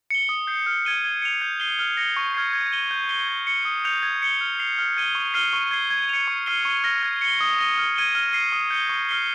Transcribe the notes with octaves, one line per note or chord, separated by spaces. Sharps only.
C#7 G7
D#6
G6 C7
F6
G#6 D#7 G7
G#6
C#7 F7
G6
C7 D#7 G7
F6
A#6 C#7 G7
C#6
F6 G#6 C7
G#6
D#7 G7
G6
C7 G7
G#6
C#7 G7
D#6
G6 C#7 F7
G#6
C#7 G7
F6
C7 F7
F6
G#6 D#7 G7
C#6
F6 C7 D#7 G7
C#6
G#6 C7 G7
G#6
C#7 F7
C#6
F6 C7 D#7 G7
C#6
F6 A#6 C#7
G#6
C#7 G7
D#6
A#6 D#7 G7
F6
G#6 D#7 G7
F6
C7 D#7
D#6
G6 C#7 G7
C#6
F6 C7 G7